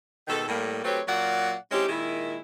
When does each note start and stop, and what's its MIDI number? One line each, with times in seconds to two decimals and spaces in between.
0.28 0.44 44
0.28 0.44 47
0.28 0.44 51
0.28 0.44 69
0.48 0.82 45
0.48 0.82 55
0.48 0.82 58
0.84 1.01 54
0.84 1.01 57
0.84 1.01 60
0.84 1.01 67
0.84 1.01 71
0.84 1.01 73
1.07 1.55 46
1.07 1.55 54
1.07 1.55 74
1.07 1.55 77
1.07 1.55 78
1.71 1.87 56
1.71 1.87 60
1.71 1.87 61
1.71 1.87 63
1.71 1.87 64
1.71 1.87 67
1.88 2.39 46
1.88 2.39 51
1.88 2.39 56
1.88 2.39 64